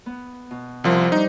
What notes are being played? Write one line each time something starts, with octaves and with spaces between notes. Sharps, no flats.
B3
B2
C2 F3 A#4 C5 E5
G3 D4 D#4